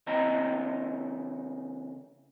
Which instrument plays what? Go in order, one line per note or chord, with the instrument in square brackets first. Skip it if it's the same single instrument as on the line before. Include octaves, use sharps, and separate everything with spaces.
[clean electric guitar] C#3 E3 C4 D#5 A#5 B5